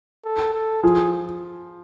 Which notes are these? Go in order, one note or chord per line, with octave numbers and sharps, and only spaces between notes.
A4
A4
F3 G#4